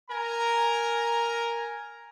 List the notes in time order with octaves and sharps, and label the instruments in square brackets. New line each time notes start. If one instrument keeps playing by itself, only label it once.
[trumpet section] A#4 G#5 A#5